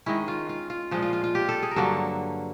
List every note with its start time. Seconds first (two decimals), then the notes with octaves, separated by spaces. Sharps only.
0.06 D#3 G#3 C#4 E4
0.28 F4
0.49 F4
0.70 F4
0.91 A#2 F3 G#3
1.02 F4
1.13 F4
1.24 F4
1.35 G4
1.49 A4
1.63 G#4
1.71 A#4
1.76 G2 D3 F#3 A#3 A4